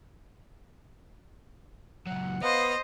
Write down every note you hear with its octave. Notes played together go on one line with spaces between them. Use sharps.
C#2 F#3 F#5
B3 C5 D#5 F5